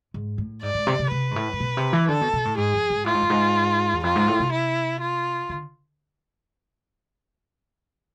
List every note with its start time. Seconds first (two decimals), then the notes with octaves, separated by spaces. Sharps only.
0.14 G#2
0.38 A2
0.63 G#2 D5
0.74 G#2
0.87 C3
0.99 C3
1.11 C3 B4
1.31 G#2
1.36 A2
1.53 A2
1.60 B2
1.77 C3
1.93 E3
2.08 D3 A4
2.21 B2
2.33 B2
2.45 A2
2.57 G#2 G#4
2.74 F2
2.90 G#2
3.06 A2 F4
3.14 G#2
3.22 F2
3.30 G#2
3.93 E2
4.03 F2 F4
4.16 G#2
4.28 A2
4.40 C3
4.52 E4
5.01 F4
5.49 D3